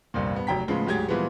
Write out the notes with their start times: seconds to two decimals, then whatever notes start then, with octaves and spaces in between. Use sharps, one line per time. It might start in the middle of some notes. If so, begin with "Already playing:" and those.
0.14 G1 C2 F2 A#2
0.35 G2 B3
0.47 F1 F#3 G5 A#5 B6
0.68 A2 C#3 F3 G#3 B3
0.86 D2 G#2 F#3 G4 G#4 G#6
1.08 A#2 E3 F3 G3 G#3 B3